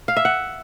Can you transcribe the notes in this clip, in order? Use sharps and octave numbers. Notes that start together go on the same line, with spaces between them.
F5
E5
F#5